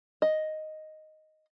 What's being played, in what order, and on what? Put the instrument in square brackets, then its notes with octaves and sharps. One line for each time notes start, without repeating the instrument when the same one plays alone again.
[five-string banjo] D#5